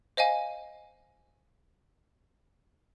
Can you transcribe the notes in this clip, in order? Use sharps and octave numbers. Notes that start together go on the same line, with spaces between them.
C5 D#5 F5 G#5